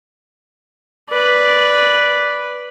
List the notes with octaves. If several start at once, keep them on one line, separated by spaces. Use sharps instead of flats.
B4 D5